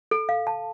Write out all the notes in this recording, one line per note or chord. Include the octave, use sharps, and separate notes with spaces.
A4
F5
A5